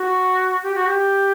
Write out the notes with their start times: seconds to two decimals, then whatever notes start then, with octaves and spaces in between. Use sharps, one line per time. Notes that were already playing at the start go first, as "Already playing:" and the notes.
Already playing: F#4
0.63 G4
0.75 F#4
0.86 G4